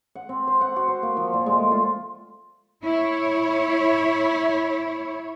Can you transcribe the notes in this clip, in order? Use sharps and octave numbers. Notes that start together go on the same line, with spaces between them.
F#5
C4
C5
F#5
F#4
C5
A#3
F3
A#2
G#3
A3
F4
E4 C#5